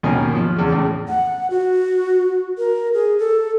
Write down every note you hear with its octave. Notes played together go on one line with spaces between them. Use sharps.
G#1 D#2 B2 C#4 A#4 G#5
F3
E2 C#3
A2 C#3
F#5
F#4
A#4
G#4
A4